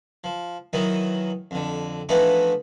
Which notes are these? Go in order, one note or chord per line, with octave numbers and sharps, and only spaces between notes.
F3
D#3 E3 F#3 D#4
F2 D3
E3 F3 A3 B3 D4 D#4